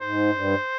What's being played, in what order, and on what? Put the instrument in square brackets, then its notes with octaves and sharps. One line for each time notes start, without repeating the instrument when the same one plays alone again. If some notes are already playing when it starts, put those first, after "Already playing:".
[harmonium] G#2 [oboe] C5
[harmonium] G2